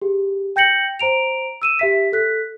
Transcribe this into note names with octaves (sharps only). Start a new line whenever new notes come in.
G4 G#4
G5 G6 A#6 C#7 F#7
C5 A#5 D7 F7
E6 D#7 E7
G4 E5 B6
A4 F#6 B6